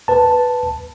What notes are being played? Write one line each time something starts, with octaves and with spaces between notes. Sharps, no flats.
B4 A5